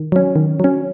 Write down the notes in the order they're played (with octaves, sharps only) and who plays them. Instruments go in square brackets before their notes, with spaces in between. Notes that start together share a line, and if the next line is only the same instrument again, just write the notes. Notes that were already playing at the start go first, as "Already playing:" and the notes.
Already playing: [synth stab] D#3
F#3 C#4
D#3
F#3 C#4